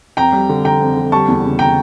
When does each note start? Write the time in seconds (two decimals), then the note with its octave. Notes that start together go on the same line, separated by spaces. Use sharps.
0.17 F2 G5 A#5
0.33 G3
0.49 D3
0.64 D3 G5 A#5
0.80 F2
0.97 D3
1.12 G3 A5 C#6
1.28 E2
1.44 C#3
1.59 G5 A#5